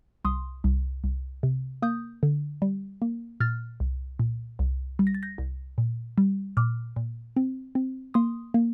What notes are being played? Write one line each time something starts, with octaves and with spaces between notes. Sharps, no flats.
C2 C6 D#6
C2
C2
C3
A#3 D#6 G6
D3
G3
A#3
A#2 F6 A6
C2
A#2
C2
G3
A#6
A6
G6 A#6
C2
A#2
G3
A#2 D6 F6
A#2
C4
C4
A#3 C6 D#6
A#3